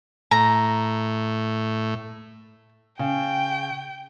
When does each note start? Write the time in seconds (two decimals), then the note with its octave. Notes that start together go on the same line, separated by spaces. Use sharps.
0.31 A2 A#5
2.99 C#3 G5